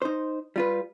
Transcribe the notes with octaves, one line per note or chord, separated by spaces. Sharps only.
D#4 C5
G3 F4 B4